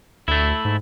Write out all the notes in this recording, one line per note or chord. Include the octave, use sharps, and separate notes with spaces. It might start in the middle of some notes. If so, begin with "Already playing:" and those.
D2 A3 E4
G#2